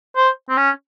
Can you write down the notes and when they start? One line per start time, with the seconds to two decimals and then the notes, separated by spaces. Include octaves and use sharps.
0.16 C5
0.49 C4
0.57 C#4